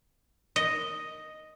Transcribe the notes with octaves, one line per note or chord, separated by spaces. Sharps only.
D#5